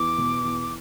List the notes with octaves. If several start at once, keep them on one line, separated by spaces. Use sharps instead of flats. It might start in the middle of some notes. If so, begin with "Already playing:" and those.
Already playing: E2 D6
B2
E2